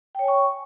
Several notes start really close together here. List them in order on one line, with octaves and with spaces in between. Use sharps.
G5 C#5 G#5 C#6